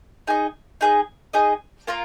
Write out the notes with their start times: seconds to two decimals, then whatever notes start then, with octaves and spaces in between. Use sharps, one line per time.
0.27 D#4 G#4 D#5
0.81 D#4 G#4 D#5
1.33 D#4 G#4 D#5
1.87 A#3 F4 A#4